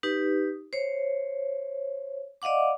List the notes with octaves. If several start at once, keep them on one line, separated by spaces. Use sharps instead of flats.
D#4 G4 B4
C5 C#5
D5 D#5 F5 F#5 D6